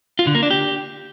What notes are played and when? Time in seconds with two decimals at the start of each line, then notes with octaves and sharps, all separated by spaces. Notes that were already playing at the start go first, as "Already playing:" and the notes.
0.19 F4
0.27 D3
0.35 A#3
0.43 D4
0.50 G4